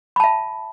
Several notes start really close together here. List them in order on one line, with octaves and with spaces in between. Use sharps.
B5 A5 E5